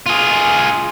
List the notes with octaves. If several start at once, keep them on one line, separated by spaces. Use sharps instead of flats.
F4 G#4